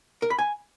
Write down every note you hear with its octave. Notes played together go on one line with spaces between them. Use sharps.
A#4
B5
G#5